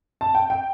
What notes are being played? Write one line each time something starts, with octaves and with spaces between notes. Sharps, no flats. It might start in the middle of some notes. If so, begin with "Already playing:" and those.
A5
G5
G5